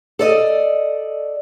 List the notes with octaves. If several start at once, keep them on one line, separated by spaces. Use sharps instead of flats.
A4 D5 D#5